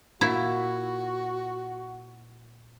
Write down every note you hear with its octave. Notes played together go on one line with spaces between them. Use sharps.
A#2 E4 F#4